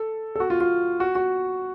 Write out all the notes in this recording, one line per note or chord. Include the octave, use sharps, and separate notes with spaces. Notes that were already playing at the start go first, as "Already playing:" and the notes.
Already playing: A4
A4
F#4
F4
F4
F#4
F#4